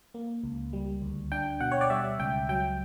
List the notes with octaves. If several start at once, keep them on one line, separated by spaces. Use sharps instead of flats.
A#3
C#2
G3
D2
D4 G5
B2 F#5
C#5
D5
G3 E5
C#2 G5
F#3 G5